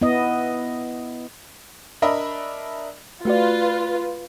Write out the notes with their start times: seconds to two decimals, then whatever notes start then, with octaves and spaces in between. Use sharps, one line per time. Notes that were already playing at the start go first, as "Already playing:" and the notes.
0.01 B3 E4 D#5
2.02 D4 A#4 D#5 E5 B5
3.25 A3 F4 F#4 B4 D5